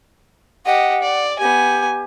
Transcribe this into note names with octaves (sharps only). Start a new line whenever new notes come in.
G4 D#5 F#5
D5
B3 G4 G#5